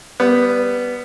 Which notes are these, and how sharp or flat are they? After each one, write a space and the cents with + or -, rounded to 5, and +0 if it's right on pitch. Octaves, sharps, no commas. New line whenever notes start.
G3 +0 B3 +0